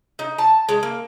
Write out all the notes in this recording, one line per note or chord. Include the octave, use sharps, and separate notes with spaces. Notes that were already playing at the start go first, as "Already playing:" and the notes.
D#4
A5
G#3
A#3